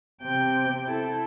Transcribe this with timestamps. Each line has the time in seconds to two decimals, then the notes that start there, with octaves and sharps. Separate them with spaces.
0.22 C3 G5
0.87 E4 A4